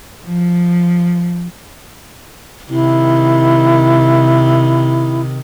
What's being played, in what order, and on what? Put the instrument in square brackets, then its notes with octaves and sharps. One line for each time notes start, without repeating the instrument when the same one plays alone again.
[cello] F3
[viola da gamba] C3 D#3 [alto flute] E4